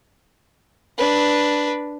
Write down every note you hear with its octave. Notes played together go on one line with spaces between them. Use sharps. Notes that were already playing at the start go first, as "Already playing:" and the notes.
D4 B4